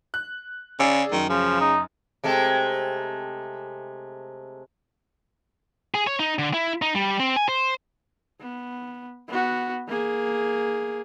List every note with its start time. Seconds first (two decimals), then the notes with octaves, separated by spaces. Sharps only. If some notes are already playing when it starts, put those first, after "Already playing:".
0.14 F#6
0.79 C#3 G#4 D5 E6
1.12 F#2 D#3
1.29 C#3 F3
1.61 D#4
2.24 C3 G#3 A3
5.94 G#4
6.07 C#5
6.20 D#4
6.39 D3
6.54 E4
6.82 D#4
6.95 G3
7.20 C4
7.36 G#5
7.48 C5
8.41 B3
9.28 B3 F#4
9.88 A#3 G#4